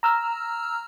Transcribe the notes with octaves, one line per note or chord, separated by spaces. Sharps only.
A#5 E6 F6